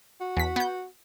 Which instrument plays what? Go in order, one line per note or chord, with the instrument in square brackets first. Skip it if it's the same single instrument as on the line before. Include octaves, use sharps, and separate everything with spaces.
[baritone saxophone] F#4
[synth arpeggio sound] E2 B6
B3 G6